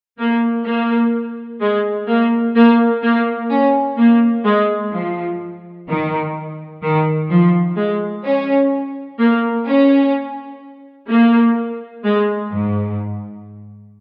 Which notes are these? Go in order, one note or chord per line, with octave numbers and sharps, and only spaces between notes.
A#3
A#3
G#3
A#3
A#3
A#3
C#4
A#3
G#3
F3
D#3
D#3
F3
G#3
C#4
A#3
C#4
A#3
G#3
G#2